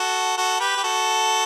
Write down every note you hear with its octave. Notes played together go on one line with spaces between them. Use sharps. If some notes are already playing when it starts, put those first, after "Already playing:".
Already playing: F#4 A4
F#4 A4
G4 B4
G4
F#4 A4